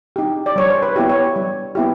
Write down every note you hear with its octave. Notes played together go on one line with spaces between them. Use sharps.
D#4 G4
D5
G3 C#5
C5
B4
B3 E4 G4
C#5
G3
B3 E4 G4